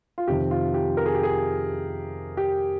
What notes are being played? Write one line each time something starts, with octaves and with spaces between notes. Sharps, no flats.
F4
F2 C3 D#3 G4
F4
G4
A#4
G#4
G4
G#4
G4